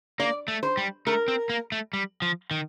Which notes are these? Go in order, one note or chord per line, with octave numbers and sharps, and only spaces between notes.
A#3 D5
A3
C5
G3
A3 A#4
C4
A#3
A3
G3
F3
D#3